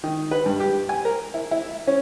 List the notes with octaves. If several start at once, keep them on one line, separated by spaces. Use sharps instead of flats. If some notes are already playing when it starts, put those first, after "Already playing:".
D#3
B4
G2
G4
G#5
A#4
E4
E4
C#4